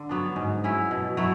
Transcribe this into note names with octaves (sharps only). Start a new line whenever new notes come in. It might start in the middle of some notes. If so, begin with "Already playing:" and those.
Already playing: D3
F#3 B3 D4
G#2
F#3 C#4 E4
B2
F#3 A3 E4